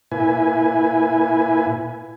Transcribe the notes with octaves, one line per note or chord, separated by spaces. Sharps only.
A#2 E4 B4 G#5